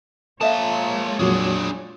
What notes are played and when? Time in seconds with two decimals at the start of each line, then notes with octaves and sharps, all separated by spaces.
0.41 G#3 A#3 F4 A4 C#5 E5 F5 A5
1.19 F2 A#2 F#3 D4 G#4